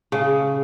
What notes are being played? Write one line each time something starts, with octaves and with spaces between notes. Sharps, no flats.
C#3